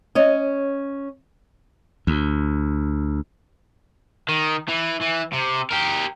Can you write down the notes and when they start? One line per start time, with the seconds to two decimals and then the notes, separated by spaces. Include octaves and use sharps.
0.15 C#4 C#5 D#5
2.07 D2
4.29 D#3
4.69 E3
5.02 E3
5.33 C3
5.71 G4 A#4